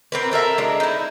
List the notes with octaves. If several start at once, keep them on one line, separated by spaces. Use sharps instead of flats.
C4 A#4 B4
F#4 A4 A#4 E5
G#3 D4
D#4 E4